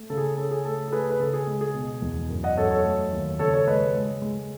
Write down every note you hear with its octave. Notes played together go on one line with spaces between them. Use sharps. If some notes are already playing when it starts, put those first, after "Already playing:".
Already playing: A3
C#3 A4
G#4
A4
C#4 A4
G#4
A3 A4
A4
A3 G#4 B4
B4
C#3 A4
G#4
G#3
G#4
B2
E2
F#2
D#5 F#5
F#2 A4 C#5
A4 C#5
A3
D#2
C#3 A4 C#5
A4 C#5
G#3 B4 D#5
G#3
G#3